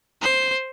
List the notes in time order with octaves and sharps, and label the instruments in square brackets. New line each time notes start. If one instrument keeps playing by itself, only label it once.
[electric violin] C5